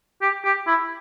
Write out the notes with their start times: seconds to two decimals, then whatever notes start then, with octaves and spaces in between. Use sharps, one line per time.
0.22 G4
0.44 G4
0.67 E4